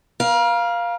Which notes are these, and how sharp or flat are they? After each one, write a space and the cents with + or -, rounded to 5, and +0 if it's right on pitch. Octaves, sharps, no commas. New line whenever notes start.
A#4 +40 F5 +0